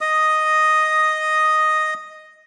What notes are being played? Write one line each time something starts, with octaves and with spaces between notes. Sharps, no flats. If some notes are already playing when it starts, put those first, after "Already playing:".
D#5 D#6